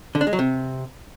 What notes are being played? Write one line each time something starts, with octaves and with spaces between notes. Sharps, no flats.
D3
D4
G#3
F#3
C3